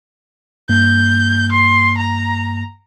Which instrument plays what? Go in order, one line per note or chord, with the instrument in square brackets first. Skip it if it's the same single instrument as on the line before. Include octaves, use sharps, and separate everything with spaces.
[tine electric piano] G2 A#3 [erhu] G6
[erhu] C6
A#5